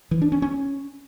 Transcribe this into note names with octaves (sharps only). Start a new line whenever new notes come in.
E3
D4
C#4
C#4